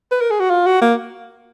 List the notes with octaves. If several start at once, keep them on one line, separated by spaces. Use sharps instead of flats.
B4
A#4
G#4
F#4
F4
F#4
A#3